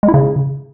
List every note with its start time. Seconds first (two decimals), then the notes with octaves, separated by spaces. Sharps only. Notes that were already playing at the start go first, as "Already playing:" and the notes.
0.03 G#3
0.08 E4
0.14 C#3